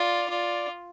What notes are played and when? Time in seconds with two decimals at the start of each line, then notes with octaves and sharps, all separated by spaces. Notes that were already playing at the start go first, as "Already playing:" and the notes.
Already playing: F4 D5
0.30 F4 D5